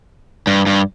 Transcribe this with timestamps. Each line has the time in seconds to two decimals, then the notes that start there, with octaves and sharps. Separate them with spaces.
0.47 G2
0.67 G2